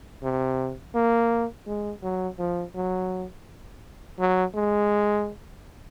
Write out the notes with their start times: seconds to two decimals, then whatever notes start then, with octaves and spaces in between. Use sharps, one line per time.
0.23 C3
0.95 A#3
1.67 G#3
2.03 F#3
2.39 F3
2.75 F#3
4.19 F#3
4.55 G#3